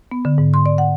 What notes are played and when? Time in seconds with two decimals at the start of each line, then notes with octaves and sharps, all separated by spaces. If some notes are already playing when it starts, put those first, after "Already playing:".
0.11 B3
0.25 D3
0.38 G#2
0.54 C6
0.66 D5
0.78 F#5